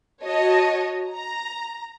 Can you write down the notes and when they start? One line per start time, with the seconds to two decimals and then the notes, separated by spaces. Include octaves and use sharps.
0.23 F#4 C#5 D#5 A5
1.09 A#5